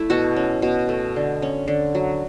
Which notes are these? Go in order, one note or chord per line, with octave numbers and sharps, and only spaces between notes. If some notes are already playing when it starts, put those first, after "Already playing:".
Already playing: A3 E4
B2 F#4 A4
C#4
B2
A3
D3
C#4
D3
F#3